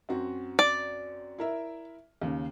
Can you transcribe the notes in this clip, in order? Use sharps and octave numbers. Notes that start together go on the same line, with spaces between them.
F#2 C4 F#4
D5
E4 A#4 E5
D#2 C#3